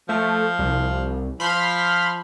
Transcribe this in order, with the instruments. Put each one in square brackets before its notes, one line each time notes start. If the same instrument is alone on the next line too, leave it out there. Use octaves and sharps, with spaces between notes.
[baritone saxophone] F3 [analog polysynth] A3
[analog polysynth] C2
[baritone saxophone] F3 [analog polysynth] B5 C6 F6